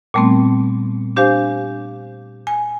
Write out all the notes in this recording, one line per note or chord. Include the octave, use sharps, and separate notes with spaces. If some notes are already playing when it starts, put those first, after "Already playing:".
A#2 G3 A3 B3 C4
D4 G4 C5 F5 G#5
G#5